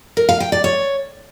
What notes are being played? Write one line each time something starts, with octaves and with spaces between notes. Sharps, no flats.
A#4
F5
G5
D5
C#5